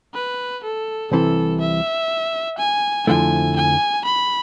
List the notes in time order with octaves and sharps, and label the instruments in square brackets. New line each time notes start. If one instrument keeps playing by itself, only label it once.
[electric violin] B4
A4
[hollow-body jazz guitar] C2 C3 E3 [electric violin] A4
[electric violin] E5
G#5
[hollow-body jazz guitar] F2 D3 F3 A3 E4 [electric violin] G#5
[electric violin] G#5
B5